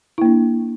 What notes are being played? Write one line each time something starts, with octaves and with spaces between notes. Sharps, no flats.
A#3 D4 E4